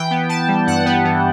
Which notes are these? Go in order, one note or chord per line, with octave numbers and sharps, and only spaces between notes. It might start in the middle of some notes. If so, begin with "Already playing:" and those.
Already playing: E3 G5
B3
B3 A5
G3
G2 F#5
B3
E3